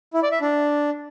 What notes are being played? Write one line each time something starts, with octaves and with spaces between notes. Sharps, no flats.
E4
D5
E5
D4